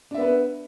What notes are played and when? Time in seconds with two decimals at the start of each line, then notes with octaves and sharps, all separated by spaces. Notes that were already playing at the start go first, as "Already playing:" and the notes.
0.11 D4
0.14 E5
0.18 B3
0.21 B4